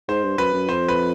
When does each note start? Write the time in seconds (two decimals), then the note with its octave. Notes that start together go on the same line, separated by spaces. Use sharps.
0.08 G#2 C5
0.24 G2
0.38 F#2 B4
0.53 F#2
0.68 F2 C5
0.88 B4